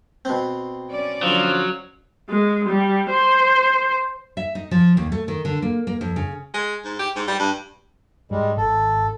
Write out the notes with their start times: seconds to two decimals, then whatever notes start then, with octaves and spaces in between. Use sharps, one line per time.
0.25 B2 C4
0.91 C#4 D5
1.23 D3 F3 F#3 F5
2.30 G#3
2.69 G3
3.11 C5
4.37 E5
4.55 D#4
4.71 F3
4.97 D#2
5.12 A3
5.28 D#3
5.45 D3
5.62 A#3
5.87 A#3
6.01 F2
6.16 C#3
6.54 G#3
6.84 G#2
6.99 G4
7.16 G#2
7.27 G3
7.39 G2
8.31 G#2 G3 G#3
8.57 G#1 A4